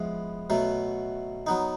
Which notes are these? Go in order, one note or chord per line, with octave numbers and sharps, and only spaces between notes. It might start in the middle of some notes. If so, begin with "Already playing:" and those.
Already playing: F3 G#3 B3 E4
B2 F#3 A3
F#3 B3 D#4